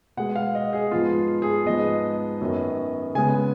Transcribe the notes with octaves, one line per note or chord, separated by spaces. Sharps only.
B2 G#3 B3 F#5
F5
D#5
G#4
G#2 F3 B3 F4
G#4
G#2 F3 G#3 B3 D#5
F#2 D#3 F#3 B3
C#3 G#3 B3 G#5